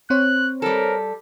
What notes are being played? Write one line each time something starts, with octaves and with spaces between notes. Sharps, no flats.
C4 C5 C#5 F#6
G3 A4 A#4